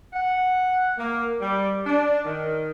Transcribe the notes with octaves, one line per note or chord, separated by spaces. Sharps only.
F#5
A#3
G3
D4
D#3